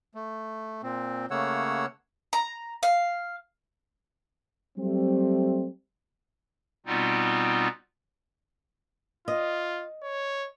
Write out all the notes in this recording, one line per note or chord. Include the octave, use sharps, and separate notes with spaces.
A3
A#2 C4
C#3 A3 A#3 C#5 F#5 E6
A#5
F5
F#3 G3 A3 C4
B2 G3 B3 C4 D#4 F4
F4 D#5
C#5